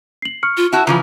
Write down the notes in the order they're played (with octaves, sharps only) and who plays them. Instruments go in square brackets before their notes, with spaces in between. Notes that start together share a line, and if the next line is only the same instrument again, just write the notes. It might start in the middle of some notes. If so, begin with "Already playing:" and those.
[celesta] C7 F#7
C#6 F6 C#7
[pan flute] F4
[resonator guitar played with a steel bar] E4 F#4 [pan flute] A5
[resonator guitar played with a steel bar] C#3 E3 F3 [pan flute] F4 [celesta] A#5